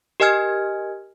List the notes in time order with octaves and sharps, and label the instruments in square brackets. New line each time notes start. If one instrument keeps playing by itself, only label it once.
[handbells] G4 A#4 D#5 G#5 F6 G#6